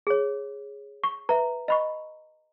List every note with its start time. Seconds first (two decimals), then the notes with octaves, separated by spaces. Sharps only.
0.07 G#4 C#5
1.04 C#6
1.29 B4 E5 A#5
1.68 D#5 B5 C#6